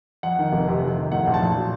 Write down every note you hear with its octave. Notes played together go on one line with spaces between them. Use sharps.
F2 F#5
D#3
F1
C3
F2
D#3
A2 F#5
A#1 F#5
A5
A#1
F#3